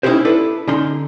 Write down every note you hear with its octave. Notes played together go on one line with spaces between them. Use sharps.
C#4 D#4 E4 F#4 G4 C5
D4 E4 A4 B4
D3 C#4 D#4 C6